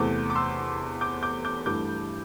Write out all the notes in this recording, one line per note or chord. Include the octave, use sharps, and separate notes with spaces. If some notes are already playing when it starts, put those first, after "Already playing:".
Already playing: E2 C3 A3 D6 G6
D6
C6 E6
D6 G6
D6 G6
D6 G6
G2 E3 A3 D6 G6